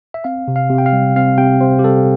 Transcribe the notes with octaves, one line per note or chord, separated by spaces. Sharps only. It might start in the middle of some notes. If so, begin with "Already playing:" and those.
E5
C4 F5
C3
F5
C3
G5
F5
G3
C4 F5
C3 G5
C3 C5
G4
G3 A4